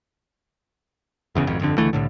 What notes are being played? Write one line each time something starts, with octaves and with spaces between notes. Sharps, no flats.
F#1 E2 C#3
G#1 F2
G1 F2 D3
C#2 D3 E3 A3
C2 A2 D3